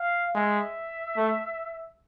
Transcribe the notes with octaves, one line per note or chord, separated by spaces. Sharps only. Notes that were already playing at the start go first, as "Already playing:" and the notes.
Already playing: F5
G#3 E5
A3